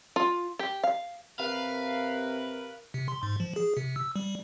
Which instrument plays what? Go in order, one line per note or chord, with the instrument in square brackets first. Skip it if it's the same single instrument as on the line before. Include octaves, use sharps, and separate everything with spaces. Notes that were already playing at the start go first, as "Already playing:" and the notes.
[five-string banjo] F4
G4
F5
[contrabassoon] C3 [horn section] A#4 B4 [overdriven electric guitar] F5
[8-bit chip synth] C3
C6
G#2
F3
G#4
C3
E6
G3